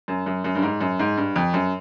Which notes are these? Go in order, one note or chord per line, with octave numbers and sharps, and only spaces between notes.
F#2
F#2
F#2
G2
G#2
F#2
G#2
G2
F2
F#2